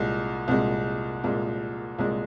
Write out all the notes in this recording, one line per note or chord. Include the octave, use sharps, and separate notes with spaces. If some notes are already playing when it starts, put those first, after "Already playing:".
Already playing: C2 A#2 G#3
C2 A#2 G#3
C2 A#2 G#3
C2 A#2 G#3